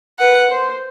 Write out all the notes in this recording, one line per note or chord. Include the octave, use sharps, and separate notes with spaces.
B4 F#5
C5